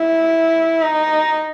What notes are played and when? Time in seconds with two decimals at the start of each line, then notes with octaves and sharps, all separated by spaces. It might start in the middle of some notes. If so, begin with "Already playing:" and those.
Already playing: E4
0.83 D#4